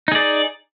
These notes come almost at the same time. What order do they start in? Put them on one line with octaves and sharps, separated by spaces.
D#4 G#4 D5